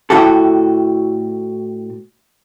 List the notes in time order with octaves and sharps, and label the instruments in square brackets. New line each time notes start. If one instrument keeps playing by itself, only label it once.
[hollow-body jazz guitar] A2 E4 F#4 G4 A4